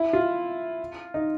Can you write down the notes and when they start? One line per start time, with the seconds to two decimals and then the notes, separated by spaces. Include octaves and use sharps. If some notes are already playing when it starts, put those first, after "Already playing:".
Already playing: E4
0.13 F4
1.14 D#4